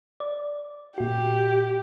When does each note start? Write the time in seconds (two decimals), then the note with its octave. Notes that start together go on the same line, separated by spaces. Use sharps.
0.20 D5
0.98 A#2 F#4 G4